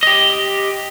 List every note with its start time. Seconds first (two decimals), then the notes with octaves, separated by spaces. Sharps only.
0.03 G4 D#5